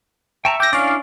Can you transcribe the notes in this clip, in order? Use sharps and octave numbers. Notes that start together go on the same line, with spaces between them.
E5 G5 A5 A#5 C#6
G5 D6 G6 A#6
C#4 D4 E4 D5 F5